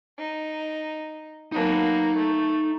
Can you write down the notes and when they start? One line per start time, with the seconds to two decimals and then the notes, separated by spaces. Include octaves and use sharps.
0.18 D#4
1.52 F#3 A#3 B3 D#4 A5
2.16 A3